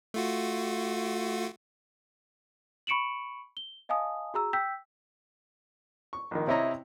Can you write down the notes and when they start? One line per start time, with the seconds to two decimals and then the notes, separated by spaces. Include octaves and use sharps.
0.14 A3 F4 F#4
2.87 B5 C#6 C#7 D7 E7 F#7
3.57 G7
3.89 D#5 F5 G#5 A5 D#6
4.34 F#4 G#4 A#5 E6
4.53 G5 E6 G6 B6
6.13 C#6
6.31 A#1 D#3
6.47 C3 C4 E4 C#5 D#5 A#5